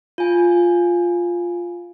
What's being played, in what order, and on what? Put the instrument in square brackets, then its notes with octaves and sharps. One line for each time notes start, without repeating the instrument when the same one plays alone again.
[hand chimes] F4 G#5